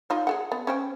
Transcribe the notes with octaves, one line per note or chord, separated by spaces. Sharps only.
D#4 F4 C#5
G#4 A4 F#5
B3
C#4 C5 G5